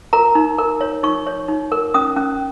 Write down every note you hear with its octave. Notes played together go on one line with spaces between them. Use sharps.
A#4 A#5
D#4
A#4
C#5
D#4 C#6
C#5
D#4
A#4
C#4 D#6
C#4